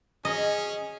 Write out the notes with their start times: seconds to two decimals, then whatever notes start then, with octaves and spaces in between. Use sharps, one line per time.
0.25 C#4 G#4 D#5